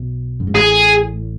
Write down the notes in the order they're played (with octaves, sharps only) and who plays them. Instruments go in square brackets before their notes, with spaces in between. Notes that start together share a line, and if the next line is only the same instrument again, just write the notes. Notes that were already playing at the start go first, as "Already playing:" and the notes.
Already playing: [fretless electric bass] B1 B2
F#2
G#2
[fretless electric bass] A1 A2 [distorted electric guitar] G#4